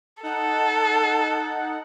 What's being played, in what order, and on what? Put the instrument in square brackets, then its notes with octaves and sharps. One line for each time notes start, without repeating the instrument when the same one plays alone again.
[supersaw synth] D#4 F#5 [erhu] A4